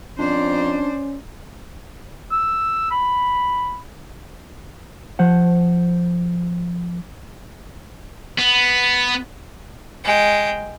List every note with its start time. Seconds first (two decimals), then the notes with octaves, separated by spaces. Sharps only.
0.19 F2 C#4 D4 C5 D5
2.31 E6
2.91 B5
5.19 F3 C5 F#5
8.39 B3
10.04 G#3 G5